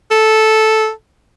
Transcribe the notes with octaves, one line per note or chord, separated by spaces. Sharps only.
A4